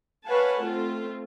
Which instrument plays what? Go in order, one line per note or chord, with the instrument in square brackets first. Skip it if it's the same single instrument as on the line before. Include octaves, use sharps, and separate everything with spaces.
[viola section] B4 C#5 F5 F#5 G#5 A5
A3 C4 F4